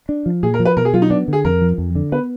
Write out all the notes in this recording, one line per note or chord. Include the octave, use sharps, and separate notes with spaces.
D4
F3
A#2 G#4
A#4
F3
B4
B2 A#4
G#4
F#3 F4
D#4
B3 D4
D3 G#4
F2 A#4
F3
F2
D3
B3 B4